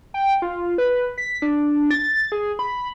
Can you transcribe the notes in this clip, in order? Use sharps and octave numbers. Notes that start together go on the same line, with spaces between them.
G5
F4
B4
B6
D4
A6
G#4
B5